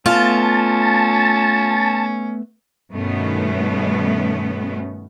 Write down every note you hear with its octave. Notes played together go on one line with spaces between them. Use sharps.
A3 B3 C#4 F4 A5
G2 B2 D#3 A3 B3 C#4